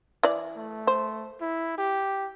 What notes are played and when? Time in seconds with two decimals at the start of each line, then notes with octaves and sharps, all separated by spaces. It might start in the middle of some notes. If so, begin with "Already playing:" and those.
0.23 E3 D5
0.57 A3
0.87 C5
1.41 E4
1.78 G4